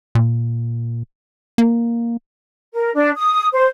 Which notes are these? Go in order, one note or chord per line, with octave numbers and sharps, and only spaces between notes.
A#2
A#3
A#4
D4
D#6
C5